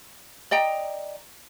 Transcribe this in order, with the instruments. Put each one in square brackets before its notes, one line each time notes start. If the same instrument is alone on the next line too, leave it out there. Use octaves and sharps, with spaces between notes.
[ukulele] D5 D#5 G5 A#5